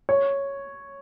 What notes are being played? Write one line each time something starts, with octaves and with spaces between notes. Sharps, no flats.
C#5